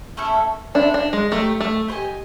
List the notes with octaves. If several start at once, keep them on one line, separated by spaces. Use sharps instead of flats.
A3 C#4 E4 A4
C4 D4 E4 A4
D4
G#3
A3 G4 A#4 C#5
A3
G4 C5 D#5 G#5